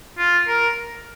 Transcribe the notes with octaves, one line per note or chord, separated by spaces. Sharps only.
F4
A#4